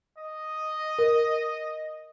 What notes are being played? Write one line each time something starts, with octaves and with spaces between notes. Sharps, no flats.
D#5
A#4